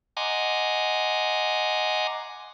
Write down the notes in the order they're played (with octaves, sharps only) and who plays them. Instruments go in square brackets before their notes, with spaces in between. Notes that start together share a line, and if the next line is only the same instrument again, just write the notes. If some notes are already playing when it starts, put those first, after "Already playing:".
[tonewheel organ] D#5 F#5 G#5 A#5 C6 D6